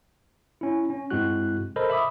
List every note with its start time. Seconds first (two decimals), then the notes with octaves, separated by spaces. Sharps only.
0.61 C#4 E4
0.90 C#4
1.10 G2 G#3 C4 E4 F#4 F#6
1.76 A4 A#4 C5 D#5 B5
1.90 E5 B5 D6 D#6